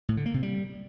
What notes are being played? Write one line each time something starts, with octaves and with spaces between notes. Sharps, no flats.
A2
D3
A#3
C3
G3